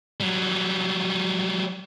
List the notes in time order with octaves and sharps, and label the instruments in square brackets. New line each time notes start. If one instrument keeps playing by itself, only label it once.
[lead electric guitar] F#3 G3